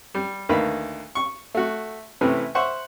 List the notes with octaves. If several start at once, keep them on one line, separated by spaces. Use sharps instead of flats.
G3
D2 D#3 A#3 B4 F5 B5
C#6
A3 F#4
C3 E3 A3 C#4 B4
C5 E5 F#5 C#6